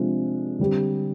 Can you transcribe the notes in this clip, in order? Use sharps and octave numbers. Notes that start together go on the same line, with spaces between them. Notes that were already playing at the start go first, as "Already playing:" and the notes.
Already playing: C3 F3 G#3 D4
D3 G3 C4 G4